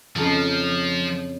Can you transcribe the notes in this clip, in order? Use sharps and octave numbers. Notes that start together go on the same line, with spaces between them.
F2 C#3 F3 D#4